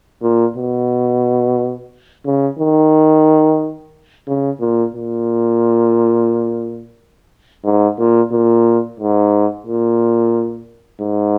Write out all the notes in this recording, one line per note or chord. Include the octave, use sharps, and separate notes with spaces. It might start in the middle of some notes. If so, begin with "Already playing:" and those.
A#2
B2
C#3
D#3
C#3
A#2
A#2
G#2
A#2
A#2
G#2
A#2
G#2